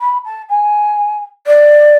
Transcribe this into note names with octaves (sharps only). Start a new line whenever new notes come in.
B5
A5
G#5
D5